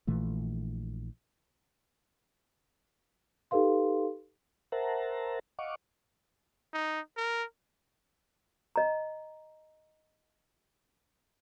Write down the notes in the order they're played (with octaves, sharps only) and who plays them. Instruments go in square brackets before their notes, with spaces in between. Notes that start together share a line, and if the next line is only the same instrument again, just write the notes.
[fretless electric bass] A#1 A#2 E3 A3
[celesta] D#4 G4 A4 B4 F5 C6
[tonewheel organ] A#4 C5 E5 F#5 A5 A#5
D#5 F5 F#5 C#6 D6
[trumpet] D#4
A#4
[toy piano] D#5 A#5